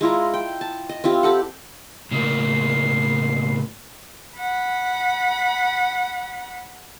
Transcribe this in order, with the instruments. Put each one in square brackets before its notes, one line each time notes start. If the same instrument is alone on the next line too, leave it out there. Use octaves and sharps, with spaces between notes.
[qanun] G#3 E4 F4 A#5
G5
A5
D#5
C4 E4 F4 G4
G4 A4 F#5
[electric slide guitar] A2 C#3 A#3 [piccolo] C7
[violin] F#5 B5